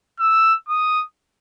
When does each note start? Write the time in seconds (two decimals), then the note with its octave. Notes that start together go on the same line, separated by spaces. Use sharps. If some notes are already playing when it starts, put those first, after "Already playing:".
0.19 E6
0.68 D#6